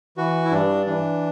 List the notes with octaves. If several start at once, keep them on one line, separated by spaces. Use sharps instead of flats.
E3 F#4
E4
G2 D4
E3 D4